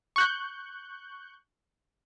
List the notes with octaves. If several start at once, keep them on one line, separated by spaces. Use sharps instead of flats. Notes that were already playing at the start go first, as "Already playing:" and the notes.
C#6 F#6 G6